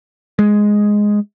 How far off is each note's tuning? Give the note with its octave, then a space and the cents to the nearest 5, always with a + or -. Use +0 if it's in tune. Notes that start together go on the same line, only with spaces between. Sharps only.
G#3 +0